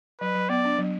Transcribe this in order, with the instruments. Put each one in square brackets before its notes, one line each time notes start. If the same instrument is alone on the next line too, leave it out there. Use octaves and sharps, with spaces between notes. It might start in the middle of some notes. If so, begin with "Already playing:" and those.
[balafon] F#3 [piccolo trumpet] B4
[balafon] F#3
[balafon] B3 [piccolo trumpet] D5
[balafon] D4
F#3